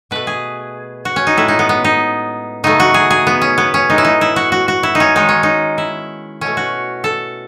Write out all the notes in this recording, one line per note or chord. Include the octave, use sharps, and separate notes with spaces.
B2 A3 B4
G#4
F#4
C#4
D#4
A2 G#3 E4
D#4
B3
B3
D#4
C#3 F#3 A3 D#4
F#4
G#4
G#4
B3
C#4
B3
C#4
A2 G#3 D#4
E4
D#4
E4
F#4
F#4
F#4
E4
D#4
C#4
D#3 G#3 D#4
C#4
D#4
E4
B2 A3 C#4
F#4
A4